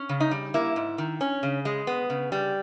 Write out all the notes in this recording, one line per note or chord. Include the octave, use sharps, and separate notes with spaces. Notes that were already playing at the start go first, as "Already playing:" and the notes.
Already playing: C#4
C#3
D#4
G3
A#3 E4
G#2
D#3
C#4
C#3
G#3
B3
C#3
G3